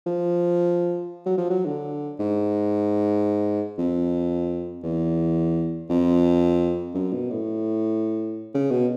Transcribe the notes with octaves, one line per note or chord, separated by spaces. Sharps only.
F3
F#3
F3
F#3
D3
G#2
F2
E2
F2
F#2
B2
A2
C#3
B2